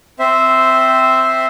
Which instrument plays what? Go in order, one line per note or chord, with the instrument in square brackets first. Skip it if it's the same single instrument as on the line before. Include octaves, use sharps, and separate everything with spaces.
[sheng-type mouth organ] C4 C5 E5